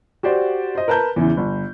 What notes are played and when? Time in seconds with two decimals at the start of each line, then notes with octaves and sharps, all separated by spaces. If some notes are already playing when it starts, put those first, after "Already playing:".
0.23 F#4 G4 C5 D5
0.75 C5 D#5
0.88 A#4 B4 A5 A#5 G6
1.16 E2 C#3 E3
1.37 G1